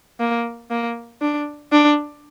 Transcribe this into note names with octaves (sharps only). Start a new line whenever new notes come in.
A#3
A#3
D4
D4